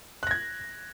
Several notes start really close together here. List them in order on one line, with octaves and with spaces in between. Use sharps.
F#6 A#6 G#6